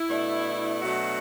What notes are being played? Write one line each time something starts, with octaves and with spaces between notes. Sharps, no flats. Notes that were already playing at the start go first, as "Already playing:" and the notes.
Already playing: E4
B2 A3 D4
B2 F#3 A3 D4 F#4